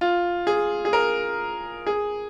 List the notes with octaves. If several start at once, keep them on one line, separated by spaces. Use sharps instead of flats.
F4
G#4
G#4
A#4
G#4